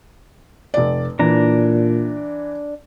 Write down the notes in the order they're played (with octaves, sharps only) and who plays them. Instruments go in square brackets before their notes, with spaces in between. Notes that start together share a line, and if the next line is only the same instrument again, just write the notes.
[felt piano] F1 D5
[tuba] A#2 [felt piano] E3 [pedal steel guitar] D4 A#5